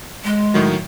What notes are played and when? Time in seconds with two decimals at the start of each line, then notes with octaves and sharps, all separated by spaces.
0.24 G#3
0.54 A2 D#3 F#3